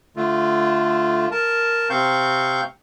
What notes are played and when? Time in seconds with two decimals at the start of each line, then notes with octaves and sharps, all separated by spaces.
0.16 D3 A3 F4
1.31 A#4 A5
1.90 C3 C4 F5 C#6 G6